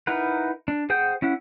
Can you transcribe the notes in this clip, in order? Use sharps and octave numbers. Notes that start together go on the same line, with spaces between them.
D#4 E4 A#4 B4 F#5
D4
G#4 C5 F#5 G5 G6
C#4 E4 F#5